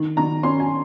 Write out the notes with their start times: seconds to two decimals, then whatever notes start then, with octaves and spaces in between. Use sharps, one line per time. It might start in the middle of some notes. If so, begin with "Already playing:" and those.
Already playing: D#3
0.17 D#3 A#5
0.43 C#4 C6
0.60 G#5